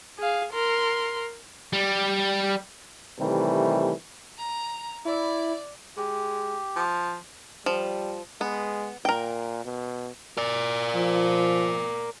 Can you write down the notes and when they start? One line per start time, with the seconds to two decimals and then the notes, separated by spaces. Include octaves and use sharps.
0.18 G#4 F5
0.53 A#4 C6
1.73 G3
3.19 C3 D#3 E3 G3 A3
4.38 A#5
5.05 E4 D5
5.97 G#3 G4
6.76 F3
7.66 F3 G3
8.41 G#3 B3
9.05 A#2 A#4 G5
9.65 B2
10.38 A#4 D5
10.96 F3